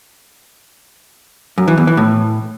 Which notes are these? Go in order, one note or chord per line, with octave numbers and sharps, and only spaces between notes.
F#2
E3
E2
E3
A2